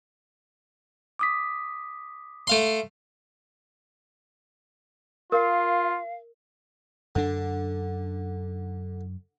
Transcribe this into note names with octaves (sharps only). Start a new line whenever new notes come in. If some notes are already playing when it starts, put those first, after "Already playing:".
D6 D#6 B6
A3 F5 C6
F4 A#4 F5
F#2 D3 D4